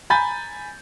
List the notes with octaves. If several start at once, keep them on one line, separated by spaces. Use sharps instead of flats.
G#5 A#5 B5 G6 A6